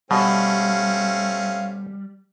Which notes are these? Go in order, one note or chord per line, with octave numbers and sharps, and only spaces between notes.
B2 G3 A3 C4 C#4 F5